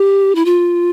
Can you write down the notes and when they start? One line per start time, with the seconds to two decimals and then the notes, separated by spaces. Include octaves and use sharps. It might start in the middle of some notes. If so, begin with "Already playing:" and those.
Already playing: G4
0.35 E4
0.45 F4